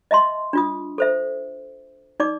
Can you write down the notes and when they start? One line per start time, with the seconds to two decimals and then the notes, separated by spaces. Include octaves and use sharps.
0.11 D#5 E5 A5 C6
0.53 D4 F4 D#6
0.98 A4 C5 E5
2.20 D#4 D5 D6